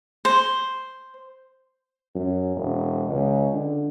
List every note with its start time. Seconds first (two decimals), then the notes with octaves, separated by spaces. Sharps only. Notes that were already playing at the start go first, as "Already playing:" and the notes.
0.25 C5
2.15 F#2
2.56 E1
3.09 C#2
3.53 D3